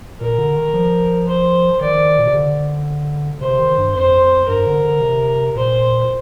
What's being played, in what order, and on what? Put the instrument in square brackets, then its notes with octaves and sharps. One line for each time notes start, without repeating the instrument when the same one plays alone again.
[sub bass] A#2 [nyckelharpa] A#4
[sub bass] D3
D#3
F3
[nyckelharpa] C5
[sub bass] D#3 [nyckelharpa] D5
[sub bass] A#2
C3
D3
[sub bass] C3 [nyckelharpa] C5
[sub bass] D#3
G2
[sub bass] F2 [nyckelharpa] C5
[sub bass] G2 [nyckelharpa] A#4
[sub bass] D3
D3
C3
[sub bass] A#2 [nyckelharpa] C5